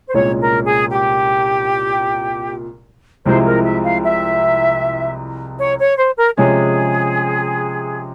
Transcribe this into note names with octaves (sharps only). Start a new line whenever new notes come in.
C5
C2 A#2 G#3 C#4 C#5
A#4
G#4
G4
C2 C3 F3 G#3 E4 C5
A#4
E5
F5
E5
C#5
C#5
C5
A#4
C3 F3 G#3 C#4 G#4